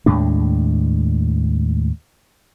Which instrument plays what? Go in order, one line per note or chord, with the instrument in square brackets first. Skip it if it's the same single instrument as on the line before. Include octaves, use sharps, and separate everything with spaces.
[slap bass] D#2 A2 G#3 D4